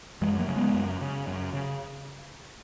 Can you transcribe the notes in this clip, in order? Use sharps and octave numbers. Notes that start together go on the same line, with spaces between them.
F#2 E3 G#3
F#3 A#3
C#3
G#3 B3
F#2
C#3
F#2
C#3